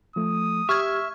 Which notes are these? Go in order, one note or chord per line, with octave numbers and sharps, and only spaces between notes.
F3 A3 D#6
G4 E5 C#6 F6 G#6